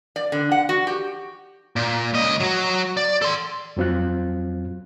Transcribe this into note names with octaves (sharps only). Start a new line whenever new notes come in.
D5
D3
F#5
F#4
G4
A#2
C#2 D#5
F#3 F#4
D5
A4 C6
F2 F#3 C4 F4 F#6